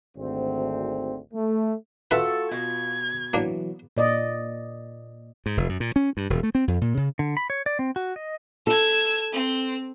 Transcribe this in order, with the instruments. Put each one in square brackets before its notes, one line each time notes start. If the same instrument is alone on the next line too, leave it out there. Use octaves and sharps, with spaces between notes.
[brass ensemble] G#1 D2 C4
A3
[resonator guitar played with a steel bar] A3 F#4 A4 [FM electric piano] F4 [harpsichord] B4 E5
[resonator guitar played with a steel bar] B2 [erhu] G#6
[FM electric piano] E3 F#3 [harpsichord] A#3 D4
[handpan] A#2 D5 D#5
[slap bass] G#2
F1
F#2
A#2
C#4
G2
E1
A3
C4
F2
A#2
C#3
[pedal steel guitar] D3
B5
C#5
D5
C4
F#4
D#5
[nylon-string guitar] A4 [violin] E6 G#6
[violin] C4